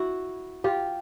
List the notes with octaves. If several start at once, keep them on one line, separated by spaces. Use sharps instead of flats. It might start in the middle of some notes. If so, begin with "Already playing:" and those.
Already playing: E4 F#4
F4 G4